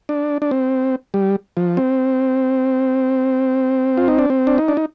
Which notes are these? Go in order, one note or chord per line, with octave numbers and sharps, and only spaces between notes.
D4
D4
C4
G3
F3
C4
F4
D#4
D4
C4
D4
D#4
D4
D#4